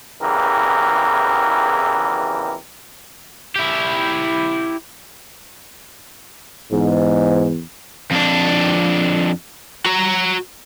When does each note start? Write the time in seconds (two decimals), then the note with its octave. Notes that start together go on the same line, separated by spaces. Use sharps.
0.21 G#1 E2 C#3 E3 G4 A#4
3.56 E4 G4
6.72 E2 G#2
8.11 F2 D4
9.85 F#4 A#5